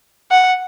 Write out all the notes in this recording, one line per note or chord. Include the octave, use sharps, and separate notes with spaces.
F#5